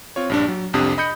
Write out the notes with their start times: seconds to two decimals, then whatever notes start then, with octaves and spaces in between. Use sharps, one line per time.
0.16 C4 F4 C#5
0.30 A#1 G2 D4
0.48 F#3
0.73 C2 F2 C3 D4 D#6
0.98 D#5 B5 D#6 G6 C#7